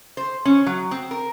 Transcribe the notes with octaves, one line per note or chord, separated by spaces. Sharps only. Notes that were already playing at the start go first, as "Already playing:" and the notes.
C5
C#4
F#3
C4
A#4